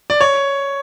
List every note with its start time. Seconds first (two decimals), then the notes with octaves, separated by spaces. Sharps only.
0.10 D5
0.21 C#5